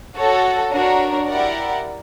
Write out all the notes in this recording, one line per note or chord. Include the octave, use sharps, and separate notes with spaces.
F#4 A4 C#5
D4 F#4 A#4 C#5
E4 G4 A#4 D5 F#5